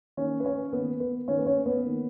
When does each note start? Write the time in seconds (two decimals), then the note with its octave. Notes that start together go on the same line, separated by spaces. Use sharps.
0.17 D#3 A#3 C#4 C#5
0.40 B4
0.45 C#4 C#5
0.73 D#3 A#3 B3 B4
1.00 B3 B4
1.28 D#3 A#3 C#4 C#5
1.38 B4
1.46 C#4 C#5
1.66 B3 B4
1.83 D#3 A#3